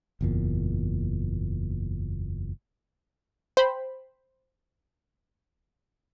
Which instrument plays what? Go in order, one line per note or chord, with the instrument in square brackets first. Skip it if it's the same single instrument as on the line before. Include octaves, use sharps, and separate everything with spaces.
[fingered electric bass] F#1 E2 A#2
[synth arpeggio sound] C5 G5 B5